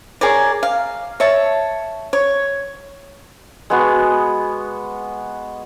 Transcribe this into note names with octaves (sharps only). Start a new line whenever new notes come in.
G#4 A#4 C#5 D5
F5
C#5 E5 A5
C#5
G#3 B3 F#4